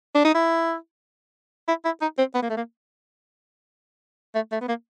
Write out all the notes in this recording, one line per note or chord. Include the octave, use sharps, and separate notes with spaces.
D4
D#4
E4
E4
E4
D#4
C4
B3
A#3
A3
A#3
A3
A3
B3
A#3